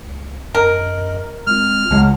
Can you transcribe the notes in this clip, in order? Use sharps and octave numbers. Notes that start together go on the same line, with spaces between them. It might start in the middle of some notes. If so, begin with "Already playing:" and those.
C#2
F#2 A#4 D#5
G#3 C4 F4 F6
C#2 G#3 F#5 A5